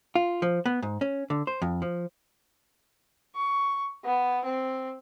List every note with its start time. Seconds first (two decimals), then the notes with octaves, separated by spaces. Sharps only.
0.15 F4
0.42 F3
0.66 B3
0.82 G#2
1.01 C#4
1.30 D3
1.47 C5
1.62 F2
1.82 F3
3.35 C#6
4.04 B3
4.44 C4